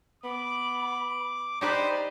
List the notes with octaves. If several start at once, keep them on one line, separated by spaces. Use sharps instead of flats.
B3 B5 D6
D#4 G4 B4 C5 D5 A#5